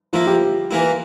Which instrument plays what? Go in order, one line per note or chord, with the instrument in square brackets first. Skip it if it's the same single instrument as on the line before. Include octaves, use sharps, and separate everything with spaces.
[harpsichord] F3 A#3 E4 [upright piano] F4
[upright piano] G4
[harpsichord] E3 A#3 E4